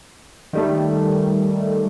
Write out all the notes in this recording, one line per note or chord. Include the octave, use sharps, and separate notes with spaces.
D#3 G3 A3